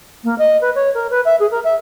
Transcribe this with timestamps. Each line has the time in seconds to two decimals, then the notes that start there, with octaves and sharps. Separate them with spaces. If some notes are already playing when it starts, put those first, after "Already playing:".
0.24 A#3
0.38 D#5
0.61 B4
0.75 C#5
0.94 A#4
1.10 B4
1.25 E5
1.39 G#4
1.51 A#4
1.64 E5